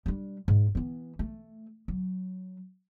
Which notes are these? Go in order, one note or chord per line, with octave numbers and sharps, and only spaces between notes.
G3 D4
G#2
E3 B3
A3
F#3